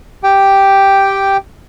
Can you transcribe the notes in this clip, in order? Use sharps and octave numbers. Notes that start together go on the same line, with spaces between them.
G4 G5